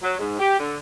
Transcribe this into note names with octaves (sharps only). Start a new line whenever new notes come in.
F#3
G#2
G4
D3